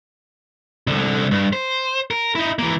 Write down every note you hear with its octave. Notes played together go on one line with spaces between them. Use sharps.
C2 D3
G2
C5
A#4
D#4 E4
E3 A#3